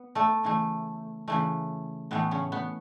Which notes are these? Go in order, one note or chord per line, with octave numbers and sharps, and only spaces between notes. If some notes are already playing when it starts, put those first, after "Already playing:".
Already playing: B3 B4
A3 A4
C#3 E3 A3
C#3 E3 A3
A2 E3 A3 B3
C#3 C#4
B3